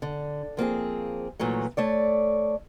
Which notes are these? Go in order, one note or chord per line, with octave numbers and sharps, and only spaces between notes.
D3
F3 A#3 C4 G#4
A#2 E3 F#3 A3
A3 C#5 D5